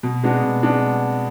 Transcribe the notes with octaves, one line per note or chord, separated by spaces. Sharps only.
B2
G#3 B3 D4 F#4
B2
G#3 B3 D4 F#4